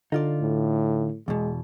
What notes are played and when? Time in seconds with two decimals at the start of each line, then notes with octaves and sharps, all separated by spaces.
0.12 D3 D#4 F4 D5
0.41 A2
1.28 E2 B2 G#3